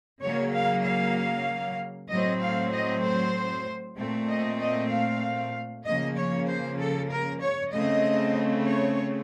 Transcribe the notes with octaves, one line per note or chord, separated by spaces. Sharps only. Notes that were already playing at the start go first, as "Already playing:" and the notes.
C#3 F#3 A#3 C#5
F5
F5
A2 F#3 C4 D#5
F5
D#5
C5
A#2 A3 C4
D#5
D#5
F5
C#3 F3 A#3 D#5
C#5
C5
A4
A#4
C#5
C#3 A3 C4 D#5
C#5